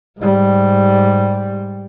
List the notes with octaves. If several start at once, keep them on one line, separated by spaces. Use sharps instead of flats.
G#2 G3